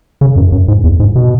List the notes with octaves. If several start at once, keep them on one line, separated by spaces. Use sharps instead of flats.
C#3
F#2
F#2
G#2
E2
G#2
B2